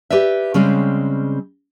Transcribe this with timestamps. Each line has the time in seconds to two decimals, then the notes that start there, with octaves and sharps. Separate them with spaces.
0.10 G4 B4 D5 E5
0.54 C#3 G3 G#3 C4 C#4